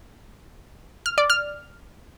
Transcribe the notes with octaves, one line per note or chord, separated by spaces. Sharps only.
F6
D5
F6